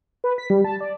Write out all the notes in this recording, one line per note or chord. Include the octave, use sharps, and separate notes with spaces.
B4
B6
G3
A5
D5